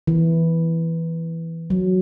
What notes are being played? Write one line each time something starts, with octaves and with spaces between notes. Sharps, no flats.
E3
F#3